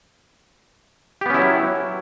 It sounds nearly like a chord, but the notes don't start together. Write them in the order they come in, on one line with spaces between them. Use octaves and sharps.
G4 B3 C#4 E4 F#3